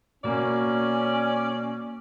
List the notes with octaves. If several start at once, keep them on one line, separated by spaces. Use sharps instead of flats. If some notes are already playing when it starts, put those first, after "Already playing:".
B2 A#3 C#4 D5